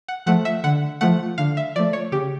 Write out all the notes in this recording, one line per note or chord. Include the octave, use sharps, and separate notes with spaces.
F#5
F3 A3 F#5
E5
D3 F#5
F3 A3 F#5
D3 F5
E5
F3 A3 D5
C#5
C#3 G4